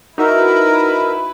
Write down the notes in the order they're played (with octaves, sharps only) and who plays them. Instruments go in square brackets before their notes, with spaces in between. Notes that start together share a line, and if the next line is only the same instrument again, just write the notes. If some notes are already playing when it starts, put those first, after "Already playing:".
[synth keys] D#4 F#4 E5 [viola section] E4 B4 [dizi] A#4